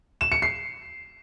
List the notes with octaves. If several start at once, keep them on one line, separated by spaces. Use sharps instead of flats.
E7
C#7
C7